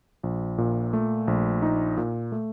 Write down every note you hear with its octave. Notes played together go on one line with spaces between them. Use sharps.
A#1
A#2
A3
A#1
D#4
A#2
A3